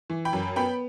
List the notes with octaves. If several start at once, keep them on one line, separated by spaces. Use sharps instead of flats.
E3
G5 B5
F#2
B3 G5 B5